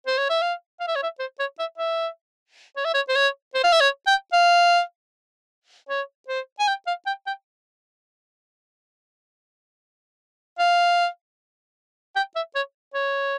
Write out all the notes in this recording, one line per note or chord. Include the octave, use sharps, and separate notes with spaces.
C5
C#5
E5
F5
F5
E5
C#5
E5
C5
C#5
E5
E5
C#5
E5
C#5
C5
C#5
C5
F5
E5
C#5
G5
F5
C#5
C5
G#5
G5
F5
G5
G5
F5
G5
E5
C#5
C#5